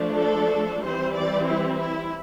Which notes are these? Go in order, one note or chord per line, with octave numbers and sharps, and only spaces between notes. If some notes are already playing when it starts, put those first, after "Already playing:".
Already playing: F3 A3 D4
A4
E3 G3 C4 C5
D5
E4
E4